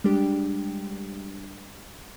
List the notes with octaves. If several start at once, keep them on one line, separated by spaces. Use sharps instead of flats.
G3 G#3 D4 G4